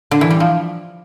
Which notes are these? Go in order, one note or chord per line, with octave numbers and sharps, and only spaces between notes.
D3
E3
G3
F3